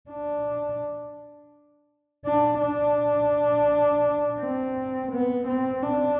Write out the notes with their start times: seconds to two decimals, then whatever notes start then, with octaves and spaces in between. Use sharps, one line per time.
0.10 D4
2.26 D4
2.61 D4
4.40 C4
5.12 B3
5.47 C4
5.82 D4